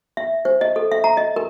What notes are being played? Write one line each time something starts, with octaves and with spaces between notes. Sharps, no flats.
E5
C5
D#5
A4
E5
A#5
D#5
A#4